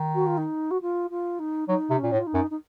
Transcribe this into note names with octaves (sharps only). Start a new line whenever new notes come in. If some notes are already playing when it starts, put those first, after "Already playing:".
Already playing: D#3
F#4
F4
D#4
F#4
F4
F4
D#4
F#3 D#4
C3
C#4
A#2
A2
F4
D#4
F#2
D#4